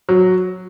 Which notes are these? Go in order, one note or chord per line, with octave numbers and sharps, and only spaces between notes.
F#3